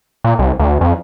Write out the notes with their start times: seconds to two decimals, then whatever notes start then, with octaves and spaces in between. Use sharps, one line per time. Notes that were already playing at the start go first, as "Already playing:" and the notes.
0.24 A#2
0.39 C2
0.59 D2
0.81 F2